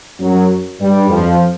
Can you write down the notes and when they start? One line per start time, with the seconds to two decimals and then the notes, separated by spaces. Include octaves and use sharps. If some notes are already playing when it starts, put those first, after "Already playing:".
0.20 F#2 F#3
0.80 G2 G3
1.10 F2 F3